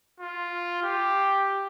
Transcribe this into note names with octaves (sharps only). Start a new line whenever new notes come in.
F4
G4